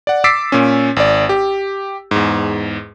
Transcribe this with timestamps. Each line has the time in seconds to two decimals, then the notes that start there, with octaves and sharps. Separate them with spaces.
0.07 D5 F#5
0.24 D6 E6 A6 B6 C7 D7
0.52 A#2 C#4
0.96 G#1 D5
1.29 G4
2.11 E2 G#2